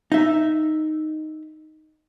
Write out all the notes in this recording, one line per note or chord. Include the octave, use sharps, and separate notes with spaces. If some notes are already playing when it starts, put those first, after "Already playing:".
D#4 E5